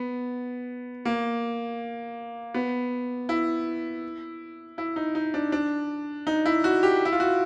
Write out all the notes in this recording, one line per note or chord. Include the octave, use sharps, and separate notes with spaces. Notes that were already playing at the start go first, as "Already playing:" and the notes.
Already playing: B3
A#3
B3
E4
E4
D#4
D#4
D4
D4
D#4
E4
F#4
G4
E4
F4
F#4